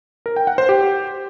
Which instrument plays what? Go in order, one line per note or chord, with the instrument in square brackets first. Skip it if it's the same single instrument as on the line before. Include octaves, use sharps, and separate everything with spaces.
[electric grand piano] A#4
G5
F#5
C5
G4